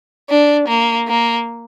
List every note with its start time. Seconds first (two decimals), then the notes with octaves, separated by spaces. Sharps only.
0.29 D4
0.68 A#3
1.08 A#3